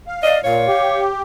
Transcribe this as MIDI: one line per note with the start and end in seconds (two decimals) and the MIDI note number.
0.07 0.42 77
0.23 0.42 74
0.23 0.37 75
0.44 0.67 46
0.44 1.08 73
0.44 1.01 77
0.68 1.22 67